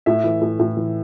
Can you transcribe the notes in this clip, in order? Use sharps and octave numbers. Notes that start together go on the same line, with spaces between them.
A2 E5
E3
A2
A2
E3